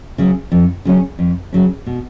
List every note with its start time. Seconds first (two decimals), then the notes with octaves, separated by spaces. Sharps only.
0.18 C#3 F#3 C#4
0.52 F2
0.85 C#3 F#3 C#4
1.19 F2
1.52 C#3 F#3 C#4
1.86 B2